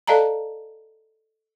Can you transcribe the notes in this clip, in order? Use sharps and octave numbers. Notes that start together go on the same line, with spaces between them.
A4 D5 D#5 F5 A5 A#5